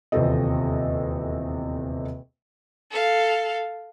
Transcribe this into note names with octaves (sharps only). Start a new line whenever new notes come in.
D#1 E2 C3 C4 A4 D#5
A4 F5